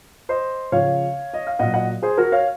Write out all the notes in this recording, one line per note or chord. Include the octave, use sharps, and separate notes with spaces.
C5 D#5
C#3 F3 C#5 F5
D#5
F5
A#2 F#3 D#5 F#5
D#5 F#5
G#4 C5
F#4 A#4
C#5 F5